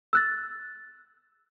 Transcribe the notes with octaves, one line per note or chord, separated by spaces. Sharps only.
E6 F#6 A6